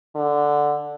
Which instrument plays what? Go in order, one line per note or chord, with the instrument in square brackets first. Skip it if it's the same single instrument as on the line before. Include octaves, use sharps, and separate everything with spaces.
[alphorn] D3